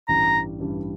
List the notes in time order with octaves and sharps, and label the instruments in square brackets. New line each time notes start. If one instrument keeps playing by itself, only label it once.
[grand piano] A1 G2 E3 G3 [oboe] A#5
[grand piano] A1 G2 E3 G3